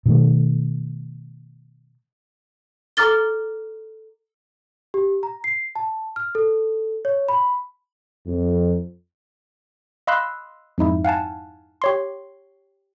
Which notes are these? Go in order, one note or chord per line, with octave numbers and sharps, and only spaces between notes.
B2 D#3 A3
A4 A#5 D6 F6 A6 G7
G4
A#5
C7
A5
F6
A4
C#5
B5
F2
D#5 F5 B5 C6 E6 F#6
F2 G#2 D#4 E4
F5 F#5 G#5 A5
G4 C#5 C6